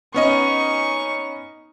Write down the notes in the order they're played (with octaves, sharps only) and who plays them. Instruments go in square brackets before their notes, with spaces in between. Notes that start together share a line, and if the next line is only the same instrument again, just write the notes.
[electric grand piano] B3 C#4 D#5 [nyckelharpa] D#4 C#6